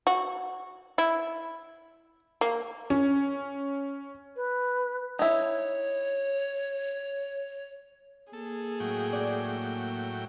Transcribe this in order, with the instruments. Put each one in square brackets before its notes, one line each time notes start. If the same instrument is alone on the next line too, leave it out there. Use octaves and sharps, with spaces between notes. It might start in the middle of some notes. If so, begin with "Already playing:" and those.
[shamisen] F#4
E4
A#3
[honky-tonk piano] C#4
[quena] B4
[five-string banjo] D#4 E4 [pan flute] C#5
[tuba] A#3 [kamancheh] G#4 [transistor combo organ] A4
[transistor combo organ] A2 F#3 G5
[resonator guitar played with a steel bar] D5